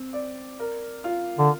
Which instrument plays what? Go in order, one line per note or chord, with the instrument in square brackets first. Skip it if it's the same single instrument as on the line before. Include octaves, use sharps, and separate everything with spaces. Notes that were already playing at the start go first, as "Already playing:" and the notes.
Already playing: [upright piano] C4
D5
A#4
F4
[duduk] D3